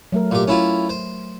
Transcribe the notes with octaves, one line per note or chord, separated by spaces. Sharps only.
F#3 A3 A#4
A#2 G4
C#4 E4 F4
C5